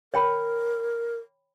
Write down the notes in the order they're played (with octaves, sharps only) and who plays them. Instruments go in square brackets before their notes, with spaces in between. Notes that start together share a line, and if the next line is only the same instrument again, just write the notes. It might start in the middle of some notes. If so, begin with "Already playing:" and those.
[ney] A#4 [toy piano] C#5 G5 B5